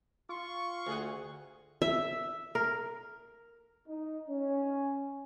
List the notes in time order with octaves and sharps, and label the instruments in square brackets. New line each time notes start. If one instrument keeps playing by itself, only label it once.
[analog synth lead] F4 [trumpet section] C6 C#6
[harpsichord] D2 [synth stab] F#4 G#4 F#5
[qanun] E5
[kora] A#4
[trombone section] D#4
C#4